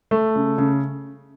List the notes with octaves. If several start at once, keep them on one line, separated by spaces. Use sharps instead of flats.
A3
C#3
C#3